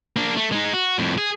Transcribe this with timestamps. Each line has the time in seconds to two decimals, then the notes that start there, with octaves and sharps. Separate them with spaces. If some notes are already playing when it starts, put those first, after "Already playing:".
0.16 A#3 D4
0.37 A3
0.52 G#3 D#4
0.73 F#4
0.98 F2 A2
1.18 G#4